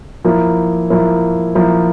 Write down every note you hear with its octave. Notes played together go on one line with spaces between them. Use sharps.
F3 A#3 E4
F3 A#3 E4
F3 A#3 E4